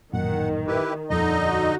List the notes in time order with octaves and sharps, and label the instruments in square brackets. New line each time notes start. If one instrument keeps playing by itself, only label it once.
[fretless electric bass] A1 F#2 A#2 [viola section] D#3 [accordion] F#5
[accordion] E4 G4 B4
[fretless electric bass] D#1 F2 [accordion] D3 D#4 D#5
[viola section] F#4